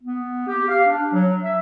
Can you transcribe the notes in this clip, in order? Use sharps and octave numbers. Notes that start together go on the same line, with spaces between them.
B3
G4
F5
D4
F#3
E5